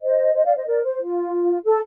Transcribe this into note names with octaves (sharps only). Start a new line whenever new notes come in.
C5 D#5
C5 D#5
D5 F5
C5 D#5
A#4 D5
C5
F4
A4